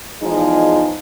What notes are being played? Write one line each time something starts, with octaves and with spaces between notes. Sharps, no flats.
E2 F3 G#3 D#4